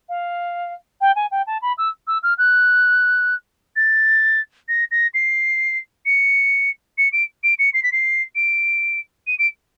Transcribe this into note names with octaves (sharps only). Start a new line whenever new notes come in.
F5
G5
G#5
G5
A5
B5
E6
E6
F6
F#6
A6
A#6
A#6
C7
C#7
C#7
D7
D7
C#7
C7
B6
C7
D7
D#7
D7